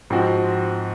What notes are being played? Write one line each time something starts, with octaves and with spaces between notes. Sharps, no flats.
G#2 F3 C4 F#4